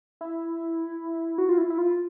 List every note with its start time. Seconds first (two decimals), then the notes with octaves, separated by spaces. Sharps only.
0.21 E4
1.38 F#4
1.49 F4
1.58 E4
1.70 E4
1.78 F4